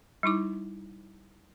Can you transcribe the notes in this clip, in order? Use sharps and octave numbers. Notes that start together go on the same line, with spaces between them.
G3 D#4 E4 D6